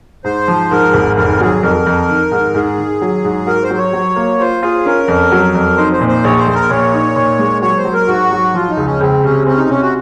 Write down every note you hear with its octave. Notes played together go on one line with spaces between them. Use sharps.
G#2 C5
F3
G#2 A#4
G#1
F1 A#4
F#3 G#4
F2 A#4
F2
D#3
G#2
G#2 G#4
D#3
F#3
G#2
F#4 A#4
C5
F#3
C#5
F#3
A#3
F4 C5
F4 G#4
C#4 A#4
F2
F#3
F2
D#4 C5
C5
A#2
C5
A#1 C#5
C5
A#1
A#4
A#2 C#5
D#4
A#2
G#3
F#3 C#5
C5
F#3
A#4
G#2 F#4
F#3
F3 F4
D#4
C#2
C#4
C#2 C4
C3 C#4
C4 C#4
D#4
C3 C#4
F#4